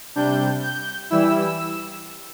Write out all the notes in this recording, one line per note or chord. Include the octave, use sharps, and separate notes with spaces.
C3 G3 D4 G6
G6
E3 G3 E4 E6